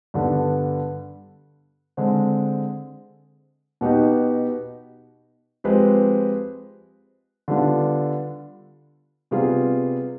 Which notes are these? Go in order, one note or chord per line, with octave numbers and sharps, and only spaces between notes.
G2 D3 G3 B3
D3 G#3 C4
B2 B3 D#4 G4
F3 G#3 C4 G4 B4
D3 G3 B3 D4 F4
C3 G3 B3 F4 G#4